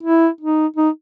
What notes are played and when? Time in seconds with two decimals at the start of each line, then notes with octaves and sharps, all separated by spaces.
0.03 E4
0.41 D#4
0.77 D#4